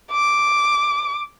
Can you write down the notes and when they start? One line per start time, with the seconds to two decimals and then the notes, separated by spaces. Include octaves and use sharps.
0.12 D6